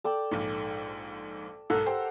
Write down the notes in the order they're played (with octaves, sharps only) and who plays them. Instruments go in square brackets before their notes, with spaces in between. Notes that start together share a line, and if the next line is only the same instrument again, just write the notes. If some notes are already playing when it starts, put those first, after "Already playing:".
[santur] A4 D5 G5
[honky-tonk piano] A#1 G#2
[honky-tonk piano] B1 G#2 [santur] A4 A#4 F#5
[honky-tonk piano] G4 C5